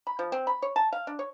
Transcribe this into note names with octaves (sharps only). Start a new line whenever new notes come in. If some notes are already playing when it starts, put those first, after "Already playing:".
B5
F3
C4
B5
C#5
A5
F5
D4
C#5